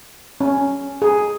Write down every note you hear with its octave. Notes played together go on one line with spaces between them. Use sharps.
C#4
G#4